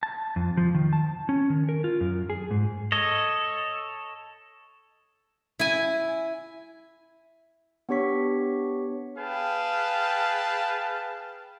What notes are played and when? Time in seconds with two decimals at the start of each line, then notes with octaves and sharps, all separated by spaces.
0.03 A5
0.36 F2
0.57 F3
0.75 D#3
0.93 A5
1.29 C#4
1.50 D#3
1.69 A#4
1.84 F4
2.01 F#2
2.30 G#4
2.51 G#2
2.92 A4 C#5 D#5
5.59 E4 G#5
7.89 B3 D4 G4 C#5 C#6 B6
9.18 G#4 B4 F5 G5 A5